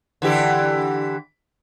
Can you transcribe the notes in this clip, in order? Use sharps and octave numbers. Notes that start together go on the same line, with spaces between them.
D3 E3 G4